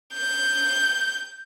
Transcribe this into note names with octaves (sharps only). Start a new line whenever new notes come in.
G6